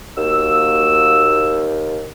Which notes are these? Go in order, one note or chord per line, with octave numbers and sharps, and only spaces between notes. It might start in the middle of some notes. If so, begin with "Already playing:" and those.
D#2 A#3 F#4 E6